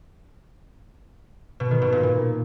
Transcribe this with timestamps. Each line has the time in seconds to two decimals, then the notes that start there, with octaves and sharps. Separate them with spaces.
1.60 B2
1.71 D#3
1.82 B2
1.92 A#2
2.03 A#2